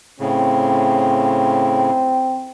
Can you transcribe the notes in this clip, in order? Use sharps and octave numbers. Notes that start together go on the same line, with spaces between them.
A2 C#3 C4